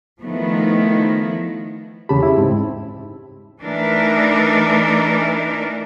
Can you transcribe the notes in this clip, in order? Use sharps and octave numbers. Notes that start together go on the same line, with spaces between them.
D#3 F3 A3 B3 E4
E2 C#3 G4 A5 B5
E4
G#2 C4
E3 A3 D4 D#4 A#4